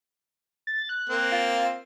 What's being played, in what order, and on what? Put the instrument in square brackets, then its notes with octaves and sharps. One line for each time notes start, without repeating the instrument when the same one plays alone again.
[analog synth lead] A6
F#6
[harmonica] A#3 C4
[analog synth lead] F4